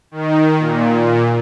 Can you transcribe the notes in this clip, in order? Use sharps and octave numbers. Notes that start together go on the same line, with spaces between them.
D#3
A#2